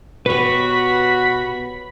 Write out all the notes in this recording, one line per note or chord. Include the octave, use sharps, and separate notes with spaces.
B2 F#4 G4 B4 C#5 B5